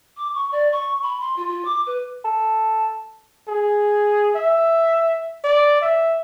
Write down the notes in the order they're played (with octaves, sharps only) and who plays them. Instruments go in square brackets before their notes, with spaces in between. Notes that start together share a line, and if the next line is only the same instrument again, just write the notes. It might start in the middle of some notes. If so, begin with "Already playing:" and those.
[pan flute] D6
C#6
D5
C#6
B5
C6
F4
F4
D6
B4
[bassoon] A4
[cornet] G#4
E5
D5
E5